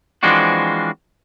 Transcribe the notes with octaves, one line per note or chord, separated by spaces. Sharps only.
E3 F3 G#3 C4 D4 F#4